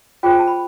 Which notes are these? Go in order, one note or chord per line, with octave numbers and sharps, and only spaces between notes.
F4 G#4 C5 G5
G#5
A5
B5